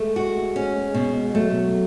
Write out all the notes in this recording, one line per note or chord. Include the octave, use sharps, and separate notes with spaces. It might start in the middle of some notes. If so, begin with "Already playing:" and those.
Already playing: G#3 A3
F#4
C#4
B2
F#3 A3